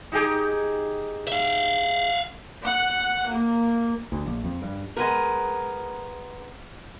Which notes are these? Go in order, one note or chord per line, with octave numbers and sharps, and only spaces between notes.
D#4 G4 G#4
E5 F5
F#5
A#3
D2
A#1
F2
G2
G#3 B3 A#4